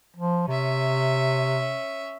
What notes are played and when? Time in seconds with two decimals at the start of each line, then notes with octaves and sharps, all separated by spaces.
0.17 F3
0.48 C3 C#4 E5